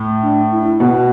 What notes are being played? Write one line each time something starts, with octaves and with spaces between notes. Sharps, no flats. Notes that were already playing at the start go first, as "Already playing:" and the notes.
Already playing: A2
D4
E4
B2 F#4